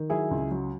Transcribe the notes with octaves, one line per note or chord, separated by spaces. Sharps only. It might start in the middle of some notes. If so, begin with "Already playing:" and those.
Already playing: D#3
F#3 E4 G#4
C#2
F#3